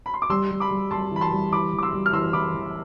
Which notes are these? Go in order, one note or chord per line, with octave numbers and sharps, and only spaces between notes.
B5
C6
D6
G3 C6 E6
G3
B5 D6
G3
G3 A5 C6
E3 B5
A5 C6
G3
E3 B5 D6
E3
D6
C6 E6
G3
F6
E3 C6 E6
E3 B5 D6
E3